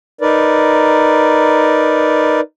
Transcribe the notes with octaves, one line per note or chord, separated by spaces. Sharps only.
D#4 A#4 B4 D5